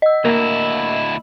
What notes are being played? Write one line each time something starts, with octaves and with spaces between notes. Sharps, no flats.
D#5 E6
D2 A#3 E4